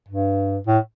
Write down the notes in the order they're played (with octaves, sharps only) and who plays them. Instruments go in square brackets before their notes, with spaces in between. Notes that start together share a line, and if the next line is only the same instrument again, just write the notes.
[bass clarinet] G2
A2